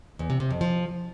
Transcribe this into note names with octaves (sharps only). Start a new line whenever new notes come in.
E2
C3
C3
F2
F3